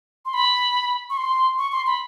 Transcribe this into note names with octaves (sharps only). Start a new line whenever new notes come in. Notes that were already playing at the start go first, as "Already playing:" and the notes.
C6
B5
C#6
C6
C#6
C6
B5